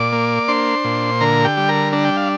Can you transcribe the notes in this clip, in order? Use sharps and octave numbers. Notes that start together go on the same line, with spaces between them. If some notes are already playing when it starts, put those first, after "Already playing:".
Already playing: A#2 D5 D6
A#3
D4 C5 C6
A#2
D3 A#4 A#5
G4 G5
G3
A#4 A#5
D4 A#5
G5
F5